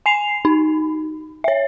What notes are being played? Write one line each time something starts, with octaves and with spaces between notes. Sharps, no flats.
G#5 C7 F7
D#4
C#5 E5